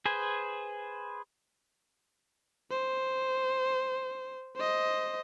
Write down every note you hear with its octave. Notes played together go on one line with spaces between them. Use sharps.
G#4 B4 C5 G#5
C5
C5 D#5